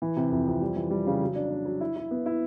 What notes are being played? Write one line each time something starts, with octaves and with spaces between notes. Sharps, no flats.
E3
C3
F2
F2
G3
E3
G3
C#3
F#3
D4
D4
F#3
E4
E4
B3
E4